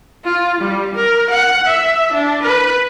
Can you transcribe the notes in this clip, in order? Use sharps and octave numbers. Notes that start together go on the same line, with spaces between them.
F4
G3
A#4
F#5
E5
D4
B4